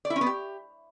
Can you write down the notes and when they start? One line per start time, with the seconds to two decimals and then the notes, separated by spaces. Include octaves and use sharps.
0.05 D5
0.10 E4
0.16 C#4
0.21 B3
0.26 G4